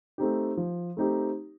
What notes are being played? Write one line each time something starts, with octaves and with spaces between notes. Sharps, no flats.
A3 C4 D#4 G4
F3
A3 C4 D#4 G4